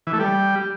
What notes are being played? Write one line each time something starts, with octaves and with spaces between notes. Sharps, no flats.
E3
A3
G3